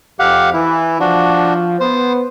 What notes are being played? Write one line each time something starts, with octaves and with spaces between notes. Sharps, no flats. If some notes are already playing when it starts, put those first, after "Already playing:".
F2 G4 F5 F#5
E3 E4
F3 D4 F#4
B3 C5